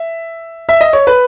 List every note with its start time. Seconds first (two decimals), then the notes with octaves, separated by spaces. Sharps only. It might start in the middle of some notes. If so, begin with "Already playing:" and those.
Already playing: E5
0.69 E5
0.81 D#5
0.93 C#5
1.07 B4